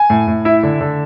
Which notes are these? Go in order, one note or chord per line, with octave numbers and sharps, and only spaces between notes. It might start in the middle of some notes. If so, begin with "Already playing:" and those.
Already playing: G#5
A2
A2
E4 E5
D3
D3